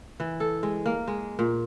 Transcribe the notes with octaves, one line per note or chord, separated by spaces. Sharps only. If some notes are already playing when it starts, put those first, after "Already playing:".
E3
A4
G#3
A#3
G#3
A#2